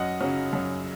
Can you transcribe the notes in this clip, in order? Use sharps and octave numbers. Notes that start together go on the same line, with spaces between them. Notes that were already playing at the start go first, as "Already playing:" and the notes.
Already playing: F#2 D#5 F#5
C#3 F#3 C#4
F#2